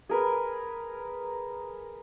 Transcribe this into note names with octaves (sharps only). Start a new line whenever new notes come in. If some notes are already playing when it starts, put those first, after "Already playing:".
G#4 A#4 B4